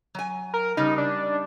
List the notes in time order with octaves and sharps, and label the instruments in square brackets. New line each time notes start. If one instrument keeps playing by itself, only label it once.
[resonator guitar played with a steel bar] F#3 G#5
[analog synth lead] A#4
[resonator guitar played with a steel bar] C#3 G3 [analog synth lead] D#4
[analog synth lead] D4